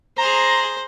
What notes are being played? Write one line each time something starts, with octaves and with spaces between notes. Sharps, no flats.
G#4 C5 A#5 C6